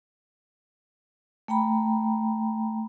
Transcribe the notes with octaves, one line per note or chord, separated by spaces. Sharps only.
A3 G5 A#5 B5